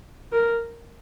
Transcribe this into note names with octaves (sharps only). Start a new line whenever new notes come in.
A#4